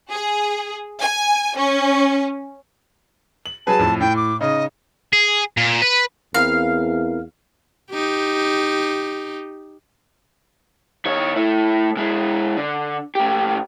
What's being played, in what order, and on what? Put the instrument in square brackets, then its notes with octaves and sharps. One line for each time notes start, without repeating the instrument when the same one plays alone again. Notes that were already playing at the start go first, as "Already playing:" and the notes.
[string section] G#4
G#5
C#4
[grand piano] F#7
[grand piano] F#3 G#4 B4 [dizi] A5
[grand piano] F2 A2
[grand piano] A2 [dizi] G5
[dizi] D6
[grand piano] C#3 D#4 [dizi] D#5
[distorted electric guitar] G#4
A#2
B4
[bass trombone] E2 [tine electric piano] C4 E4 A#4 [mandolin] F5
[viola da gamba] D#4 G4
[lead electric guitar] D#3 C#5
A3 E4
G#3 E4
D3
A2 G4